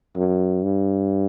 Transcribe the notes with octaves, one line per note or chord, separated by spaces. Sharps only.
F#2
G2